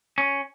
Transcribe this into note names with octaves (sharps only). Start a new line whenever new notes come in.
C#4